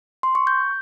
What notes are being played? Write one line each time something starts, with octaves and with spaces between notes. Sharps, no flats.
C6
C#6
G6